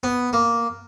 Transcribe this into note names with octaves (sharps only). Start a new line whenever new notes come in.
B3
A#3